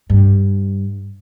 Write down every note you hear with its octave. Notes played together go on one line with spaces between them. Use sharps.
G2